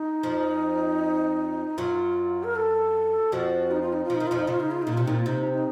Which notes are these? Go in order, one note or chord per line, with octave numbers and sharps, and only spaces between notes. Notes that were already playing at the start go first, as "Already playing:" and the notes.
Already playing: D#4
F2 F3
F#2 F#3 F4
A#4
A4
F2 F3 F#4
D#4
F4
D#4
F4
F3 D#4
D#3
F2 F3 F4
D#4
C#3 F4
D#4
F4
A#2 D#4
C3 F4
A#2 D#4
F4
C3 D#4
D#4